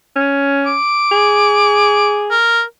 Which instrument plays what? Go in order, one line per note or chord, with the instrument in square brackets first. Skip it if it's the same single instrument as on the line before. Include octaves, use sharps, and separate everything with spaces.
[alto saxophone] C#4
[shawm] D6
[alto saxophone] G#4
[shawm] A#4